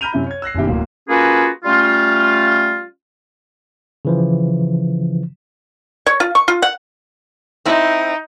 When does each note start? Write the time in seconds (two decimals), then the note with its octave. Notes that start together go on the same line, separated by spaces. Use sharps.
0.01 A#5 B5 F6 G6 D#7 F7
0.13 F#2 C3 E4 G6
0.27 C#5 G#6
0.42 E6 F#6 A#6 C7
0.54 F#1 F#2 B2 D#3 E4 G4
0.67 D1 A#3
1.09 A#3 C#4 F4 F#4 G#4 B4
1.65 G3 A3 C#4 F4
4.05 C#3 E3 F3
6.06 C#5
6.20 F4
6.35 C#6
6.48 F4
6.62 F#5
7.65 C4 D#4 E4